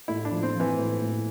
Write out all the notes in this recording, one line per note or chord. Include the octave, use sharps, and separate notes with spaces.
A2 E4
D4
F3
C4
F3
E3
A2
A2